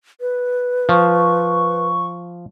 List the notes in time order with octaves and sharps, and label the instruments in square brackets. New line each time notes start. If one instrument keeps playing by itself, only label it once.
[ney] B4
[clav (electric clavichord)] F3 [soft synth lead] C#6